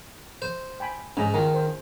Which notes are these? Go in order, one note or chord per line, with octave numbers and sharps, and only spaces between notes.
C5
G5 G#5 B5
G#2 C#4 G#4 A#5
D#3 F4 A#5
C5